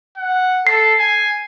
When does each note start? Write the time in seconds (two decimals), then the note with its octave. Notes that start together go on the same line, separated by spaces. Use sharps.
0.18 F#5
0.67 A4 C7
0.99 G#5